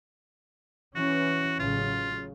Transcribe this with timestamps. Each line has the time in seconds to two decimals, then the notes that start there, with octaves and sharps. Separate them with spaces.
0.96 E3 C#4 F#4
1.59 A1 C#3 F#3 F4